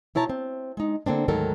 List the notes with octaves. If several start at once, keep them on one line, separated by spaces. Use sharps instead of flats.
B2 E4 C#5 A5 A#5
C4
G#3 D#4
D3 A#3 C4 D4
D2 G#2 D#3 F#3 A4 A#4